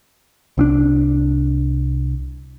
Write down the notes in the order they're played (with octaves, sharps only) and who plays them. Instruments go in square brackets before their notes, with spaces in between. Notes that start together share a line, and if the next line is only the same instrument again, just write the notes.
[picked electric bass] C2 C4 D4